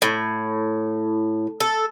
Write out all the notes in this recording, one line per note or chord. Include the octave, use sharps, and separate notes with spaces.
A2
A4